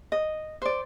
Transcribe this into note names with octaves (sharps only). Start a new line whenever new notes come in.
D#5
C5 D5